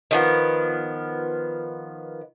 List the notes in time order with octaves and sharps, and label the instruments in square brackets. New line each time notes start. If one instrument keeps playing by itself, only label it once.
[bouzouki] D#3 F3 B3